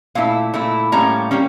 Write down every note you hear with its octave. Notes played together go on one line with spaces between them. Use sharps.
A#2 A3 E4 F5
A#2 A3 E4
A2 G3 A#3 C#4 A#5
G3 A#3 C#4